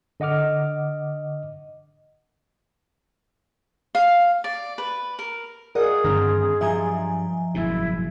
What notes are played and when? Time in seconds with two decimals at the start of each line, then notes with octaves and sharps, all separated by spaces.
0.20 D3 D#5 F#5 D6 F6
3.95 F5
4.44 D5
4.78 B4
5.19 A#4
5.75 F4 G#4 A#4 D5 D#5 F#5
6.04 G2 D3 D#3 C4 A#5 C6 F6
6.61 G2 F3 E5 G#5 A#5
7.55 F#1 G#2 B2 E4